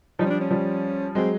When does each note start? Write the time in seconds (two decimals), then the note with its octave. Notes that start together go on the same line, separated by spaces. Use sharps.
0.19 F3 G3 D#4
0.26 C#4
0.30 D4
0.41 C#4
0.51 F3 G3
1.15 F#3 G#3 C4